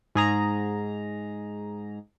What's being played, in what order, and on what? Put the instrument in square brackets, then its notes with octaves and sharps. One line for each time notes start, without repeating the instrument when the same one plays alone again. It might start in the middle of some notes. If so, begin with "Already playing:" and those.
[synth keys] G#2 G#4 A#5